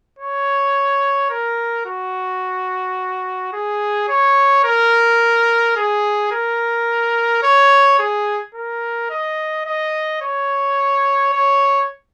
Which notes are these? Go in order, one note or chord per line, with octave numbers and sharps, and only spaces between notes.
C#5
A#4
F#4
G#4
C#5
A#4
G#4
A#4
C#5
G#4
A#4
D#5
D#5
C#5
C#5